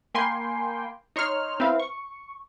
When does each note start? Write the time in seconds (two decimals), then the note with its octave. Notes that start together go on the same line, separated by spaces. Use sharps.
0.14 A#3 G5 G#5 B5 C6
1.16 D#4 C#5 C6 F6
1.60 C4 E4 B4 E5 F5
1.80 C#6